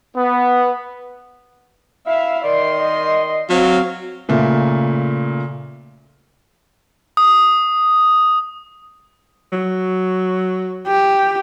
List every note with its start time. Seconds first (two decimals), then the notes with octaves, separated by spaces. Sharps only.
0.17 B3
2.07 E4 E5 F5
2.44 D#3 D5 C6
2.75 D#5
3.49 F#3 C4 F5
4.29 A#2 C#3 A3 A#3
7.17 D#6
9.52 F#3
10.87 G4